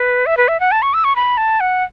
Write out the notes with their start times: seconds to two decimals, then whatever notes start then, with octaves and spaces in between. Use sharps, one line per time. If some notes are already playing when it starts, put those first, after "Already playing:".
Already playing: B4
0.26 E5
0.37 B4
0.48 E5
0.60 F#5
0.72 A5
0.82 C#6
0.94 E6
1.04 C#6
1.16 B5
1.37 A5
1.60 F#5